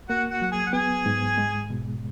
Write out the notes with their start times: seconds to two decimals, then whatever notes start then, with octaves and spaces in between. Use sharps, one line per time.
0.09 A#3 F#4 F#5
0.31 F#4 F#5
0.42 F#3 F#5
0.52 G#4 G#5
0.66 F#5
0.73 B3 G#4 G#5
1.06 G#2
1.38 G#3
1.70 B2